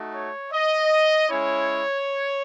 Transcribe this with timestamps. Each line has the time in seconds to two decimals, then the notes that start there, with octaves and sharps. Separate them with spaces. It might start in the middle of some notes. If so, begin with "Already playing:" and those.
Already playing: A3 D#4 F#4
0.14 C#5
0.52 D#5
1.29 G#3 C#4 E4 C#5